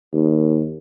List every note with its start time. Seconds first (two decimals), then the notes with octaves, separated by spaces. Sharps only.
0.13 D#2